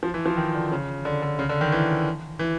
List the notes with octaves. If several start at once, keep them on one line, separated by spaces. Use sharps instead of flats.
F3
E3
F3
D#3
D3
C#3
D3
D3
C#3
D3
D#3
E3
E3